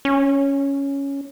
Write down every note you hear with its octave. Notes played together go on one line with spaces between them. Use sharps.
C#4